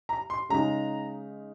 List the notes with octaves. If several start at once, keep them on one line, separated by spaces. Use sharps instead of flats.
A#5
C6
C#3 G#3 D#4 A#5